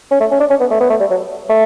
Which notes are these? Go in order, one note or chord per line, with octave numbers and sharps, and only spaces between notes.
C#4
A3
C#4
D4
C#4
B3
A3
B3
A3
G3
F#3
A3